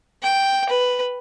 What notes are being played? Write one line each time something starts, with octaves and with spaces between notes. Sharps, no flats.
G5
B4